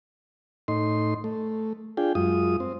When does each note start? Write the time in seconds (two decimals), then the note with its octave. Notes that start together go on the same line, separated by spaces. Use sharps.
0.68 A2 D#4 C6
1.24 A3
1.97 D4 F4 G#4 G5
2.15 F#2 G#3 F4 D#6
2.60 C4